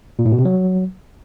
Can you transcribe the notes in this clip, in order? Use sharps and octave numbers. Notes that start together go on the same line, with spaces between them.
A#2
A2
B2
C3
F#3